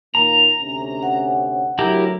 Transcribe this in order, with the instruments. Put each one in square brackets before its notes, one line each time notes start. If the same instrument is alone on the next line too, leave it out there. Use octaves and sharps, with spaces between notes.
[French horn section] A#2 D#3 A#3 [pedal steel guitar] A#5
[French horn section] D2 C3 C#4
[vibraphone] F#5
[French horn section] D2 F#3 [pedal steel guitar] E4 G4 A#4